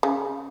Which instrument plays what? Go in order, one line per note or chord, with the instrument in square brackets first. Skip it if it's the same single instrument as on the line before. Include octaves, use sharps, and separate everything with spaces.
[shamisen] C#3